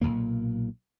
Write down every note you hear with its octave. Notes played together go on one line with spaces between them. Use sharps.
B1 F2 A#2 A#3